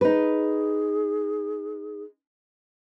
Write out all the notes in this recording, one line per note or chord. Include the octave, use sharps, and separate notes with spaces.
D#4 G#4 B4